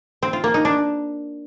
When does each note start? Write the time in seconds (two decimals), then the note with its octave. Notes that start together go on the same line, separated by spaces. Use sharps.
0.23 C4
0.33 F4
0.44 A#3
0.54 D#4
0.65 D4